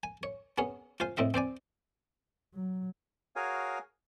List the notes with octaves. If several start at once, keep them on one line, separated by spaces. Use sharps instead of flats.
G#5
C#5
B3 C#4 G#4 C#5
F4 C5 F5 G#5
A2 C4 D#5 E5
C4 C5 D5 G#5
F#3
F#4 G#4 A#4 C#5 F5 G#5